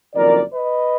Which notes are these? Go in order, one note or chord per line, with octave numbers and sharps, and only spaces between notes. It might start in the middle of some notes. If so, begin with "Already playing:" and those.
F#1 F2 D#3 A#4 D5
B4 D#5